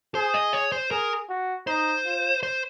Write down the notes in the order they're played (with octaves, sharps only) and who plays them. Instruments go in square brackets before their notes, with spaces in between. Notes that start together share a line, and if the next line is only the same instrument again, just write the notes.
[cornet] G#4 [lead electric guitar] C5
[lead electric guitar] D#5
C#5
C5
[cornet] G#4 [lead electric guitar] A#4
[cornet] F#4
[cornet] D#4 [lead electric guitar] C5
[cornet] F4
[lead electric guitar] C5